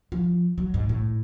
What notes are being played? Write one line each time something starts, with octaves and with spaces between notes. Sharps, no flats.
F3
F#3
G#2
A2